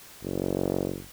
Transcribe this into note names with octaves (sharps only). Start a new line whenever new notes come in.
F#1